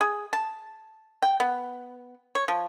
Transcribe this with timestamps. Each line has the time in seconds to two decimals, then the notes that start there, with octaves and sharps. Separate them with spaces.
0.01 G#4
0.33 A5
1.22 G5
1.40 B3
2.35 C#5
2.48 F3